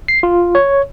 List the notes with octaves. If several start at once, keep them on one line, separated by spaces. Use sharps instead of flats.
C7
F4
C#5